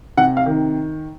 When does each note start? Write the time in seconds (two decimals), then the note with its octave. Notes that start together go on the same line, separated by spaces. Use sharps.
0.17 C3 F#5
0.37 F5
0.46 D#3